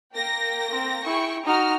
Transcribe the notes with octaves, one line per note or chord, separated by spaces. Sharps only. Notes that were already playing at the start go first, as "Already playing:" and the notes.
A#3 G5 A#6
C4
E4 G#4 G5 C#6
D#4 F#4 A#5 F6